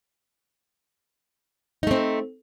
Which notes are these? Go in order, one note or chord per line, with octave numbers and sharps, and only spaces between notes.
A3 C4 D#4